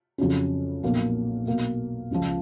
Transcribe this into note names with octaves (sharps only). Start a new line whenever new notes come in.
F2 C#3 F#3 C#4
B1 A#2 F3 A#3
B1 B2 A#3
C#2 C#3 F3